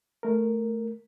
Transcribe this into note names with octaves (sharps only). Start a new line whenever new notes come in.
A3 A#4